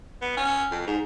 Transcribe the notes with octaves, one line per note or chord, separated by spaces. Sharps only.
B3
C#4
F2
G#2